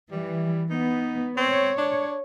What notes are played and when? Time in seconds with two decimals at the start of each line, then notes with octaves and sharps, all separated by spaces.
0.11 E3 G3
0.70 B3 D#4
1.37 C4 C#5
1.78 D4